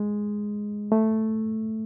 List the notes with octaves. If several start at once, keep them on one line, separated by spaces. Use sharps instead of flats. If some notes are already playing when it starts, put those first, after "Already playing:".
Already playing: G#3
A3